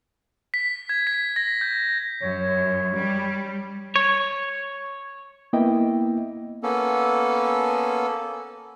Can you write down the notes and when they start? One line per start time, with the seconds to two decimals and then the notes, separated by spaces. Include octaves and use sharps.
0.54 B6
0.89 G#6
1.07 B6
1.36 A#6
1.61 G6
2.22 F#2 C#5
2.97 G3
3.96 C#5
5.53 A#3 B3 E4 D#5 E5 G5
6.63 A#3 B3 C#4 A4